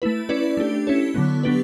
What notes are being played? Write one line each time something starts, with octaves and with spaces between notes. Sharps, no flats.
A3 E4 B4
C#4 E4 B4 D5
A3 D4 G4
C#4 E4 A4 C#5
D3 F#3 B3
F#3 B3 D4 G4 B4